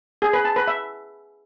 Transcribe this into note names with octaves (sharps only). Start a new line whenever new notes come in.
G#4
B4
A5
B4
E5